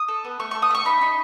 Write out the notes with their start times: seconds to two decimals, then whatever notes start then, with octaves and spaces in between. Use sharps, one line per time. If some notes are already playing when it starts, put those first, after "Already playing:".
Already playing: D#6
0.08 A4
0.24 B3
0.40 A3 C#6
0.51 A4 C#6
0.62 D#6
0.71 A3 C#6
0.85 D#4 B5
1.01 D#4